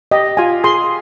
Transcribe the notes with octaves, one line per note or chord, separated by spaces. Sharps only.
G4 D#5
F4 G#5
G#4 C6